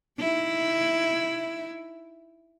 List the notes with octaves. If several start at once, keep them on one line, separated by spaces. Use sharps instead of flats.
D#4 E4